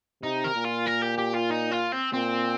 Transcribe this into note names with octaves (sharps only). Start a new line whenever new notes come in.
C3 D#4
A#4
A#2
F4
A#4
G4
G4
F4
D#4
F4
C4
A#2 C4